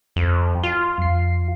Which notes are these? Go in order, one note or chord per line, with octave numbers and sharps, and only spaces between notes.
F2
F4
F2 C7